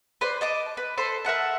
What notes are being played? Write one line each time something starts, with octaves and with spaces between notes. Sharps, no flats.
B4 C5 D5
D#5 A5 D6
B4
A4 C5 B5
A#4 E5 F#5 A5